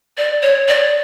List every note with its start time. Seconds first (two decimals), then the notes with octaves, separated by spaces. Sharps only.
0.18 D5
0.42 C#5
0.68 D5